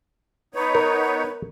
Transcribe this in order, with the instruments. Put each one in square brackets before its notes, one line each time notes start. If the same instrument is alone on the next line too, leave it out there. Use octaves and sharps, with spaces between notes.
[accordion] B3 D#4 C#5 [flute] B4
[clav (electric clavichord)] A#4